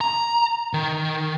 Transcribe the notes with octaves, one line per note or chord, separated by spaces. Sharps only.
A#5
D#3